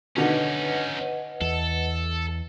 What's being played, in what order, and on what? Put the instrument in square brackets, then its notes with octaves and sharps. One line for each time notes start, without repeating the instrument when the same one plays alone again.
[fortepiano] B2 D3 D#3 [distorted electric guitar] C#4 D#4 [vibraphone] B4 D#5 F#5
[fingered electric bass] E2 [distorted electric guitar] A4